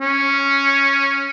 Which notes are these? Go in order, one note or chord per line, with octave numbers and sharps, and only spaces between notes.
C#4